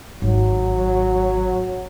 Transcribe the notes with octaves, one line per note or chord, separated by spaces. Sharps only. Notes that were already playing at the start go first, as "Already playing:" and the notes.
G#1 F#3